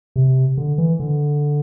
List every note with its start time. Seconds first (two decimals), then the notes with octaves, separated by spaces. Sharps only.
0.16 C3
0.57 D3
0.78 E3
1.00 D3